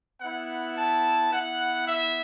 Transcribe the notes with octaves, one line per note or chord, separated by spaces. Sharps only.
B3 E4 F#5
A5
B3 E4 F#5
E5